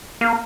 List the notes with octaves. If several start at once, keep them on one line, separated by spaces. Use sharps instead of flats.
A#3